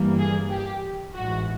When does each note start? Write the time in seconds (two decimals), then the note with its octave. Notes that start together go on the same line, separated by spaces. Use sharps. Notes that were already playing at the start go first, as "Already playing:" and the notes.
Already playing: G1 G2 E3 G3 A#3
0.18 G#4
0.50 G4
1.14 A1 G#2 E3 F#4